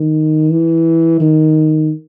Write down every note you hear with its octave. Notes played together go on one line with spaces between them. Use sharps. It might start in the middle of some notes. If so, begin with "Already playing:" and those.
Already playing: D#3
E3
D#3